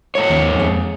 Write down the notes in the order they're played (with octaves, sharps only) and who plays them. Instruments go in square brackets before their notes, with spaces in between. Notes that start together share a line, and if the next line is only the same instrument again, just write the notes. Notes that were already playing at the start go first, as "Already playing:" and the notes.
[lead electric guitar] G#2 C#5
[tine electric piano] D#2
F2 G#4